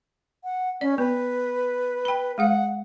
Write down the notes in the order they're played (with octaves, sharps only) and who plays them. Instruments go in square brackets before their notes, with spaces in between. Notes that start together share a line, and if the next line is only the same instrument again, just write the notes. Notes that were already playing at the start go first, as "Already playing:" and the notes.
[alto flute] F#5
[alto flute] C#4 [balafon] D5
[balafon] B3 [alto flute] B4
[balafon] G5 B5
[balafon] G#3 G#4 F5 [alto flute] F#5